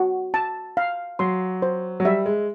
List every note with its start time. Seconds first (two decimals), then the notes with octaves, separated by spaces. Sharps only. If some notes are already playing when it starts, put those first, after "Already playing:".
Already playing: F#4
0.34 A5
0.77 F5
1.19 F#3 C6
1.62 C5
2.00 F#3
2.05 G3 E5
2.26 G#3